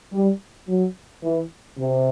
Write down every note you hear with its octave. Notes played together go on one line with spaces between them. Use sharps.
G3
F#3
E3
C3